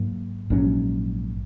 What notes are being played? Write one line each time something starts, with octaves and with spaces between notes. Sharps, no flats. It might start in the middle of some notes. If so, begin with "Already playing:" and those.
Already playing: G#2 F#3 A#3
A#1 G#2 F#3 C#4